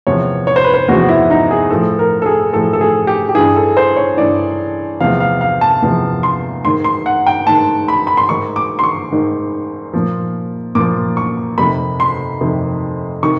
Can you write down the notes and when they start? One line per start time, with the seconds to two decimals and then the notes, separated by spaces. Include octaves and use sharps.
0.07 E2 C3 F3 C#5
0.47 C#5
0.56 C5
0.64 B4
0.74 C5
0.88 E2 C3 F3 F#4
1.09 E4
1.30 D#4
1.51 G#4
1.70 A2 F3 A4
1.99 A#4
2.22 A4
2.26 G#4
2.53 A2 F3 A4
2.73 A4
2.81 G#4
3.07 G4
3.29 G4
3.35 G2 E3 G#4
3.56 A4
3.77 C5
3.96 C#5
4.17 G2 E3 D5
5.00 E2 C3 F3 F5
5.20 F5
5.41 F5
5.61 A5
5.82 E2 C3 F3
6.23 C6
6.65 G#2 D#3 C6
6.84 C6
7.06 F#5
7.26 G5
7.47 G#2 D#3 A5
7.88 B5
8.07 B5
8.17 C6
8.29 G#2 D#3 C#6
8.56 D6
8.79 C6
8.84 C#6
9.12 G#2 D#3
9.93 A#2 F3
10.75 A#2 F3 D6
11.17 C#6
11.58 F2 C3 D#3 B5
12.00 C6
12.41 F2 C3 D#3
13.23 C3 D#3 C#6